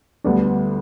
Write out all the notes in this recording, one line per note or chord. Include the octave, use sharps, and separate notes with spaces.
D2 D3 G3 B3 D4